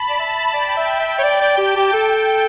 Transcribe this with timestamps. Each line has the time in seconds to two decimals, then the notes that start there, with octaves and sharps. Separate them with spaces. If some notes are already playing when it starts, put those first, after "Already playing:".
Already playing: A5 B5
0.09 D5
0.19 E5 A5
0.54 D5 G5
0.77 E5
1.00 E5
1.18 C#5
1.23 D5 G5
1.41 D5
1.58 G4 A5
1.76 G4
1.93 A4 G5